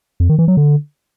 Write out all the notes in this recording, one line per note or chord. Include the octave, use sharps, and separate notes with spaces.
F2
D#3
E3
F#3
D3